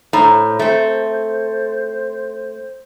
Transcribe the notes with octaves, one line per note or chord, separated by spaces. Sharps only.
A2 C5 A#5
A3 C4